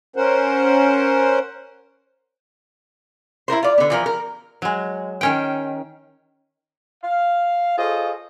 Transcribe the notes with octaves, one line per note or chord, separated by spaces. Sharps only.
C#4 A#4 C5 F#5
E4 F4 A#4 C5
F4 D5
D3 B3
E3 F3 A#4
A#4
F#3 G#3
D#3 C#4 G5
F5
F4 G#4 A4 C5 C#5 D#5